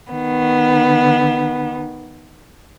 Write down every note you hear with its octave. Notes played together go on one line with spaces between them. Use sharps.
D#3 B3